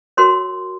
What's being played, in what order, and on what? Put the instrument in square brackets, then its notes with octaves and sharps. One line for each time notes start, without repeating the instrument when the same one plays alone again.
[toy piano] F#4 A#4 C#5 C6